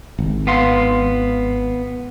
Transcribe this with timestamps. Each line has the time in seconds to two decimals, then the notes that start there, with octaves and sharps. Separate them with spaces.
0.19 G#1
0.47 B3 F5 C6